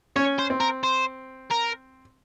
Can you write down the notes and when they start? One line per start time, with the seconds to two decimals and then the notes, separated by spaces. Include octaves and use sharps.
0.16 C#4 C#5
0.39 C5
0.50 C4
0.61 A#4
0.84 C5
1.51 A#4